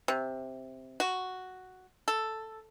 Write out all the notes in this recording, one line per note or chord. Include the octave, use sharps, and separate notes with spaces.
C3
F#4
A4